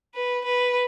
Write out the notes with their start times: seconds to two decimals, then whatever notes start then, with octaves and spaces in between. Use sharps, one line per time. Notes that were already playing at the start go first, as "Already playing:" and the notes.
0.15 B4
0.45 B4